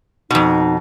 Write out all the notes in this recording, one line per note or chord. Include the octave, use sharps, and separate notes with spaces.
F2 B2 D#4